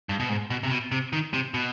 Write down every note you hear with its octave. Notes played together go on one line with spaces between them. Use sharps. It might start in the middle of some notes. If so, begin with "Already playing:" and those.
G2
B2
G#2
B2
C3
B2
C3
D#3
C3
B2